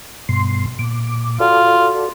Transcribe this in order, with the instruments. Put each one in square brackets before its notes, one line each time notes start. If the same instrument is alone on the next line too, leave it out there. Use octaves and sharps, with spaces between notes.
[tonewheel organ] G2 B2 C6
A#2 D6
[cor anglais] F4 [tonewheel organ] F#4 A4 D5